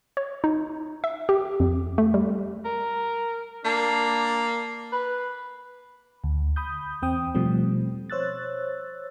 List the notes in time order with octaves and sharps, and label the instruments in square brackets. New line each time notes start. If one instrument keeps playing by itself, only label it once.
[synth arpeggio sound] C#5
D#4
E5
G4
F2
A3
G3
[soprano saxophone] A#4
[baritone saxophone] A#3 [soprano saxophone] D4
[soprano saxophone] B4
[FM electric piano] D2
B5 D#6 G6
E2 C4 G5 D#6
B2 F3 G3 A3 C4
C5 C#5 E6 F#6 A6